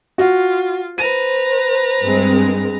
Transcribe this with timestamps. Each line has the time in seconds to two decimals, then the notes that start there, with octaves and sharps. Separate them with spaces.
0.18 F4 F#4
0.98 B4 C5 A#5 D#7
2.00 G2 G#3 C4